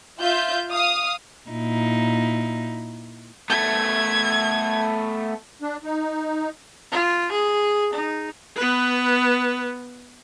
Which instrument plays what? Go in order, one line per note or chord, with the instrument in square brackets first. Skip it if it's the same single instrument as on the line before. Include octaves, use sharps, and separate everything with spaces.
[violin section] F4 E5 G6
F5 D#6
[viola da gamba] A#2 D#4 E4
[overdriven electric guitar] A3 B3 [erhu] G#6
[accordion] D4
D#4
[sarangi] F4
G#4
D#4
[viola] B3 B4